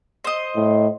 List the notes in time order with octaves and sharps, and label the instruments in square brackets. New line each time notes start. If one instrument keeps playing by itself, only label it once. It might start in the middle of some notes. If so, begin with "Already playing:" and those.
[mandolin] C5 D#5
[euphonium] A2